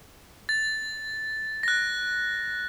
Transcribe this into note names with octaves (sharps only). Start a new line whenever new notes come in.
A6
F#6 A#6